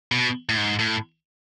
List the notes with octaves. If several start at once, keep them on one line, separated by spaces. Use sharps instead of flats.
B2
A2
G#2
A2